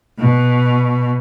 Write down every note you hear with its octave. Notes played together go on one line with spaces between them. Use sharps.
B2